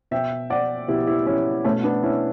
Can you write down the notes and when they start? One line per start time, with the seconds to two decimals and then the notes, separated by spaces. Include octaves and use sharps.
0.11 B2 E5 G5
0.50 D5 F#5
0.88 B2 E4 G4
1.07 E4 G4
1.26 C#4 E4
1.65 B2 A3 C#4
1.84 B3 D4
2.03 C#4 E4